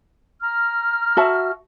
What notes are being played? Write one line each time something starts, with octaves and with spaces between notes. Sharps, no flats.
A#5 F6
F#4 E5 A5